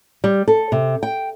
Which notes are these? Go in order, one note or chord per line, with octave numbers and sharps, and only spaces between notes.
G3
A4
C3
G5